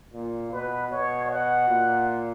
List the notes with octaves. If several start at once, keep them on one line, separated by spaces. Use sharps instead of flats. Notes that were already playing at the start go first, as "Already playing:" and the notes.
A#2
B2 B4
B2 C#5
F#5
A#2